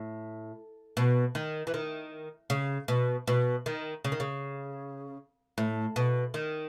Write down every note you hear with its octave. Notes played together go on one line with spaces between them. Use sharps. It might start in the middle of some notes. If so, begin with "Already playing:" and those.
Already playing: A2
B2
D#3
E3
D#3
C#3
B2
B2
D#3
C#3
D#3
C#3
A2
B2
D#3